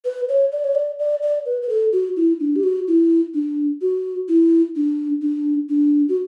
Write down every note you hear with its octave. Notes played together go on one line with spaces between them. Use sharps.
B4
C#5
D5
C#5
D5
D5
D5
B4
B4
A4
F#4
E4
D4
G4
F#4
E4
D4
F#4
E4
D4
D4
D4
F#4